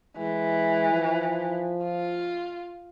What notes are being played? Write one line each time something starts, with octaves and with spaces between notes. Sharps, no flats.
E3 G#3
F3
F4